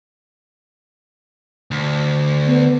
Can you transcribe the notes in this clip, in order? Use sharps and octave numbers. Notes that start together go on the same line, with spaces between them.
D2
B3